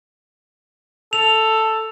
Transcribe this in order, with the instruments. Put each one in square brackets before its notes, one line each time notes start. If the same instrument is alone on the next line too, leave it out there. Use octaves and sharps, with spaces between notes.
[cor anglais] A4 [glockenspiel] F7